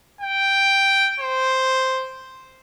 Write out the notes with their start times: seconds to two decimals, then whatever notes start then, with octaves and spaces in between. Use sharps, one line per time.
0.21 G5
1.20 C5